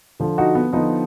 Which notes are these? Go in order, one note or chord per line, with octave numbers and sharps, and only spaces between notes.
D3 F3
D#4 F#4
B3
D3 F3 B3 D#4